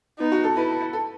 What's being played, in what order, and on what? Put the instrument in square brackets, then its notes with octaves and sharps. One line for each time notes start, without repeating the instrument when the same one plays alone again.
[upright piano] B3 [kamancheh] D#4
[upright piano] F#4
A4
[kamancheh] E4 [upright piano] B4
[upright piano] A4